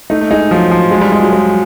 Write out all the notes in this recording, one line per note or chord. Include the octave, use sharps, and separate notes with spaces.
A3 D#4
A3
G#3 D#4
F3 F#3
F3
F#3 G#3
G3
G3 G#3
F#3
G#3